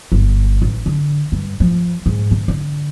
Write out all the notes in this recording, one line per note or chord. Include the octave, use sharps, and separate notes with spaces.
G1
A1
D3
G2
F3
G#2
D3
D3